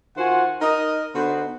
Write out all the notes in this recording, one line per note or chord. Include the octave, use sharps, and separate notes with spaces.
D#3 F4 F#4 C5 F#5 G#5
D#4 A#4 D#5
D3 B3 D#4 F#4 B4 C5